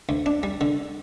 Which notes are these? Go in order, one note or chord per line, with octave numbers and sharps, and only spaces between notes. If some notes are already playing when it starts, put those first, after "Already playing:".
D2
D4
G3
D3